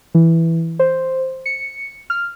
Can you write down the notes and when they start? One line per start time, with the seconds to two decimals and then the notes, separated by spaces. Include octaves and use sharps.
0.15 E3
0.79 C5
1.46 C#7
2.10 F6